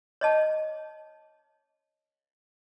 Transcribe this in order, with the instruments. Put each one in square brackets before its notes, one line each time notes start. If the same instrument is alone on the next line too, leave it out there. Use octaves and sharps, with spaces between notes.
[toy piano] C#5 D#5 A5